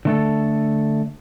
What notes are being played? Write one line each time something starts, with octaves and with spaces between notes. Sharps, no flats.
D3 A3 A4